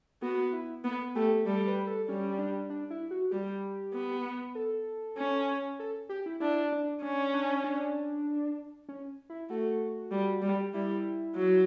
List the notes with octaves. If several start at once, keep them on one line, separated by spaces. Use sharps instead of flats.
B3 F#4
E4
B3
A3 G4
G3 A4
B4
A4
G3 C#4
D4
D4
E4
F#4
G3 G4
B3
A4
C#4
A4
G4
E4
D4 E4
D4
C#4 D4
D4
D4
C#4
E4
A3 F#4
G3
G3
G3 E4
F#3